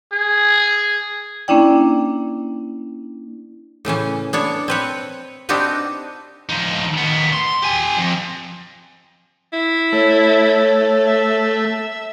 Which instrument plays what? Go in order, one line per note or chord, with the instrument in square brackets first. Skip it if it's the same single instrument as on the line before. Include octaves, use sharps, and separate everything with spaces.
[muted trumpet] G#4
[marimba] A#3 C#4 D4 E4 D5 G5
[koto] A2 C#3 E3 C#4
B3 D4 C#5
C4 B4 C#5
C4 D4 D#4 F#4 G4 B4
[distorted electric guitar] F3 D#4
D#3 B3
C6
G4 G#5
F2
[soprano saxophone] E4
[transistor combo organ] A3 [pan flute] C#5
[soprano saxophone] E5